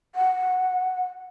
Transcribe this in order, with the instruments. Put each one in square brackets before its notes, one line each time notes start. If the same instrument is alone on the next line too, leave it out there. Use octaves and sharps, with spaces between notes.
[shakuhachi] F#5